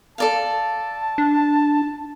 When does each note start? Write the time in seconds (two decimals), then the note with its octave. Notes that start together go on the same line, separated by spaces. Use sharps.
0.18 A4 D5 F5 A5
1.18 D4